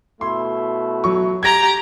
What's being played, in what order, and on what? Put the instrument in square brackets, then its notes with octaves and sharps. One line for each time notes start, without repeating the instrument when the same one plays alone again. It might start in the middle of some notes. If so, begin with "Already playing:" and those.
[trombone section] B2 A3 E4 [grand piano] C6
[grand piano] F#3 C#6
[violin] G4 A#5 [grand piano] G#6 A#6